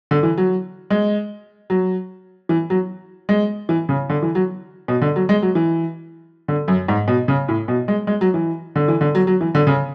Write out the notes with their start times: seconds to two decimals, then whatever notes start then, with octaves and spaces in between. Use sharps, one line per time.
0.11 D3
0.23 E3
0.38 F#3
0.90 G#3
1.70 F#3
2.49 E3
2.70 F#3
3.29 G#3
3.69 E3
3.89 C#3
4.10 D3
4.22 E3
4.35 F#3
4.88 B2
5.02 D3
5.16 F#3
5.29 G#3
5.42 F#3
5.55 E3
6.48 D3
6.68 F#2
6.88 G#2
7.08 B2
7.28 C#3
7.48 A2
7.68 B2
7.88 G#3
8.07 G#3
8.21 F#3
8.34 E3
8.76 D3
8.88 E3
9.01 D3
9.15 F#3
9.27 F#3
9.41 E3
9.55 D3
9.67 C#3